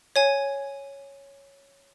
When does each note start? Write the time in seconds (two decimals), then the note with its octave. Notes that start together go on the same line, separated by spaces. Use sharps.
0.16 C#5 G#5